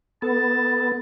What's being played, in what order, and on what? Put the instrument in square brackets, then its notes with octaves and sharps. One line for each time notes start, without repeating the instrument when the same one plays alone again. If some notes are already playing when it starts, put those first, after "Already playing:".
[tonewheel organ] B3 [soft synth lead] A4 [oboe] A5